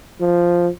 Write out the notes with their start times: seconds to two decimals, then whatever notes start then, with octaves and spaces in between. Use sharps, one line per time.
0.20 F3